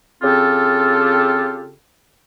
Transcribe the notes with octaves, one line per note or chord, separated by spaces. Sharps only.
C#3 C4 F4 G4 A4